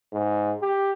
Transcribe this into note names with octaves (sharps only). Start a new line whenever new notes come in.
G#2
G4